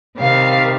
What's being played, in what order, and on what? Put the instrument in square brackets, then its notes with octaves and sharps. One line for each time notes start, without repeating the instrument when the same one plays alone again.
[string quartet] C3 D#3 G3 F5